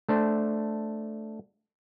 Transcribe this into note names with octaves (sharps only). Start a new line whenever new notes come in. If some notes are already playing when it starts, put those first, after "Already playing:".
A3 D4 C5